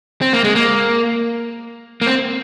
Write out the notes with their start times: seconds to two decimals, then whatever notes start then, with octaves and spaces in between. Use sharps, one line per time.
0.21 C4
0.33 A#3
0.44 G#3
0.55 A#3
2.02 A#3
2.06 C4